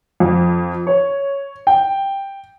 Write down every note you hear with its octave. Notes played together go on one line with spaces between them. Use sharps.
F2
C#5
G5